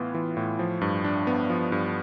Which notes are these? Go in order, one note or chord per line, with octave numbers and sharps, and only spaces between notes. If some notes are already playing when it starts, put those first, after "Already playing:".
Already playing: A2 E3 B3 F4
E3
A2
F3
G2
D4
B3
F3
G2